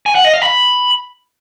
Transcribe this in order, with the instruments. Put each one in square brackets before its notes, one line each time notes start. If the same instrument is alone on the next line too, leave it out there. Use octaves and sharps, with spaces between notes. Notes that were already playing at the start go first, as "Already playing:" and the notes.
[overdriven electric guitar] G#5
F#5
D#5
F5
B5